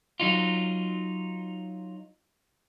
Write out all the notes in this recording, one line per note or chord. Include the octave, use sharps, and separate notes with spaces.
F#3 D#4 F4